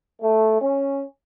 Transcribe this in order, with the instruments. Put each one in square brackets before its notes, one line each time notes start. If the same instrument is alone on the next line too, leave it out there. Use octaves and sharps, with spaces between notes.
[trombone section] A3
C#4